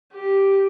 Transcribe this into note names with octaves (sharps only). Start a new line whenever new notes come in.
G4